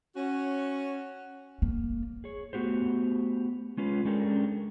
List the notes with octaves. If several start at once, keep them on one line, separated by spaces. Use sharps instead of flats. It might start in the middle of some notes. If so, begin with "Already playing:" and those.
C#4 F#4
A#3
G#4 C#5
A3 B3 F#4 G4 C5
G#3 C#4 F4 B4
G#3 C#4 D4 G4 A4 A#4